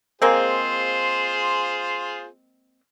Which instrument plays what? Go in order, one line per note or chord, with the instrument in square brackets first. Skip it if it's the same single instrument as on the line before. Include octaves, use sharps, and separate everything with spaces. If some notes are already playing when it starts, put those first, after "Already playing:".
[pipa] G#3 A#3 C4 [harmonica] F4 G#4 C5